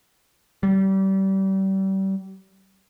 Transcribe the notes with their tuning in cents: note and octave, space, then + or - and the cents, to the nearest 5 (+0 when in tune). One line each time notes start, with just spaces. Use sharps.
G3 -30